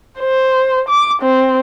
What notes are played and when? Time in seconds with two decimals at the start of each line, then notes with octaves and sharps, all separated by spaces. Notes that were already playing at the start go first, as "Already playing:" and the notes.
0.19 C5
0.88 D6
1.22 C4